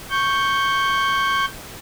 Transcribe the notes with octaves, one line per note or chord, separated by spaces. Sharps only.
C#6 G6